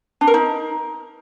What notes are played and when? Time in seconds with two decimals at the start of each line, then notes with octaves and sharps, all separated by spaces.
0.21 D4
0.27 A#4
0.34 D#4